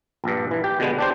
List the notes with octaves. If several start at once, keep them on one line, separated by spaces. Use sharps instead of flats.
A#1 G2
E3
G4
B2 D3 G#3 B3
D4 G4 C5